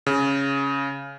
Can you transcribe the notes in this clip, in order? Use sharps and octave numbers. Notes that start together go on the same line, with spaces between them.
C#3